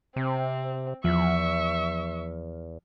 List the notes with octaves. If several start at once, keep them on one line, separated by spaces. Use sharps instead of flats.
C3 C4
E2 F3 E5 C#6